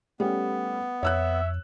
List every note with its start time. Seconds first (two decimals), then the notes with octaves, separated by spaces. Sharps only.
0.20 G3 A3 B3 C#4
1.03 F2 C#5 E5 E6 F#6